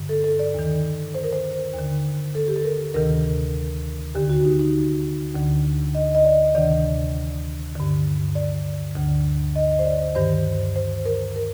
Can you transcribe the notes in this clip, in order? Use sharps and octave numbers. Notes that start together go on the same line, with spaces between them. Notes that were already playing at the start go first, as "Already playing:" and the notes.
Already playing: G2 D3
A4
A4
D5
D#2 D#3
C5
A#4
C5
D#2 D3
A4
G4
A4
A#4
D2 C3 D#3 A#4
D#2 D3 G4
F#4
D#4
D#4
D2 D3
D#5
D#5
D5
D2 C3 D#3 D5
G2 D3
D5
D2 D3
D#5
C5
D5
G2 D#3 C5
C5
A#4
A#4